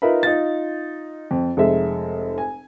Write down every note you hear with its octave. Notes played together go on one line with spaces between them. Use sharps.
D#4 F4 A#4 B4 E5 B5
D#4 F4 A6
F2
F1 G#3 E5
G#5